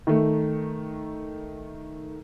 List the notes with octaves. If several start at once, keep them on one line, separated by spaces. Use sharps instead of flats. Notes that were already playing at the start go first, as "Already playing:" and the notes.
D#3 A3